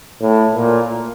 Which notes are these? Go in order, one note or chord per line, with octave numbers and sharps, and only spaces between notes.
A2
A#2